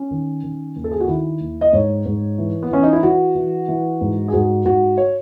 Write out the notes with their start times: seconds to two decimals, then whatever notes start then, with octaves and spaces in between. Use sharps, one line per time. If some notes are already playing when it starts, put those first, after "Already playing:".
Already playing: C#4
0.11 D#3
0.43 D#3
0.76 D#2
0.84 A4
0.91 G#4
1.00 F#4
1.07 D#3 E4
1.40 D#2
1.61 D#5
1.73 G#2 C#5
2.05 G#2
2.38 E3
2.63 B3
2.70 E3 C#4
2.83 D#4
2.93 E4
3.03 E3 F#4
3.35 E3
3.68 E3
4.01 G#2
4.28 G#4
4.33 G#2 F#4
4.65 G#2 F#4
4.97 C#5